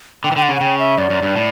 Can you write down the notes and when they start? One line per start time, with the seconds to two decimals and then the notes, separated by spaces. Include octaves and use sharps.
0.24 D3 G5
0.32 E3
0.36 D3 G5
0.42 F#5
0.49 C#3
0.56 F#5
0.61 C#3 G5
0.79 E5
0.97 F#2 D5
1.10 F#2
1.22 G2
1.36 A2